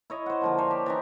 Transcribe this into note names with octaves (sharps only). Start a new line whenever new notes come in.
E4 C#5 D#5
C5 F#5
D3 F3 A#3
C5 C#5 G#5
G4
E3 D4 D#4